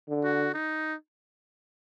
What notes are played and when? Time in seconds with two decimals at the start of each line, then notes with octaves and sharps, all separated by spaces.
0.09 D3
0.24 F#4
0.54 D#4